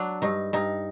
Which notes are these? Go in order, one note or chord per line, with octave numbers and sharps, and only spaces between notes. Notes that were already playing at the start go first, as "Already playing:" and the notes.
Already playing: F#3 D4
G2 D#4
G2 D#4